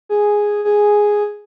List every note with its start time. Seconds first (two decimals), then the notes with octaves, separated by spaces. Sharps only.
0.09 G#4
0.65 G#4